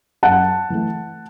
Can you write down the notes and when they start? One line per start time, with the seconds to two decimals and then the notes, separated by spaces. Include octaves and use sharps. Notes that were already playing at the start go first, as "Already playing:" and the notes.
0.23 F#2 F#5 A5
0.70 E3 A3